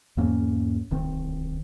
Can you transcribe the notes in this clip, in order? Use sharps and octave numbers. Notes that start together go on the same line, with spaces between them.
E2 G#2 A#3 C#4
D1 C2 D#3 C4